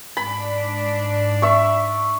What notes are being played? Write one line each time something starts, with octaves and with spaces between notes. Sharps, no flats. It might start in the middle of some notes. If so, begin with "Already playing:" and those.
G#2 D4 B5
E5 C#6